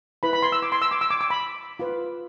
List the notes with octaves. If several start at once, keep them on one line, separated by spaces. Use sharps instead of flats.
E4 B4 B5
B5
C6
E6
D6
C6
E6
D6
E6
D6
D6
B5
F4 B4